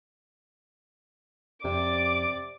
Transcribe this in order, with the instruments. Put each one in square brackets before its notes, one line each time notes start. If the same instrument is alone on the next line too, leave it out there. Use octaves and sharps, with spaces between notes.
[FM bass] F2 [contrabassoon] C3 [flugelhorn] D5 [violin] D6